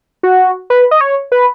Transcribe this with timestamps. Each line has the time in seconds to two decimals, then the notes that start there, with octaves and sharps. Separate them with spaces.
0.23 F#4
0.70 B4
0.91 D#5
1.01 C#5
1.32 B4